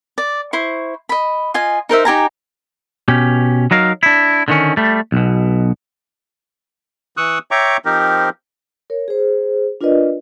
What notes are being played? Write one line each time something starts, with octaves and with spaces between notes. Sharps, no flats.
D5
E4 C5 C#6
D#5 B5
F4 D#5 G#5
D#4 A#4 C5 E5
D#4 G4 G#5 A#5
B2 C#4 G4
F#3 D#4 A#4 F5
D4 E4
D3 D#3 C#4
G3 A3
B1 B2
E3 C#6 D#6 E6 F#6
C#5 E5 G5 A#5 C#6 D6
F3 C4 D#4 G4 A#4
A#4 C#5
G#4 C5
D4 F4 A#4 B4 D5 D#5